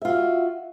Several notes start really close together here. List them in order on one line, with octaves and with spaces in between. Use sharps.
E5 F4 F#4